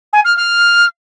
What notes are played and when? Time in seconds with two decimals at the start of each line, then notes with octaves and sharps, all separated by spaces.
0.13 G#5
0.25 F6
0.36 F6